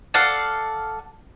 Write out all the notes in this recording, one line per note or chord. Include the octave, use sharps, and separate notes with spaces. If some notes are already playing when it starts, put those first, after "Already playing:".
A4 D5 F5 F#5